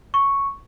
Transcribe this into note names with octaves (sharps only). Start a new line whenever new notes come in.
C#6